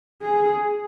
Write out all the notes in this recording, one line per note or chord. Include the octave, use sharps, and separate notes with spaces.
G#4